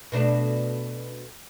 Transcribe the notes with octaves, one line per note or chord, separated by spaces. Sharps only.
B2 A3 D4